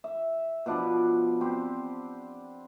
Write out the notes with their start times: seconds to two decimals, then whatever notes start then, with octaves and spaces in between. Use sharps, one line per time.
0.04 E5
0.66 B2 F3 D4 B4
1.41 C4 G4 C5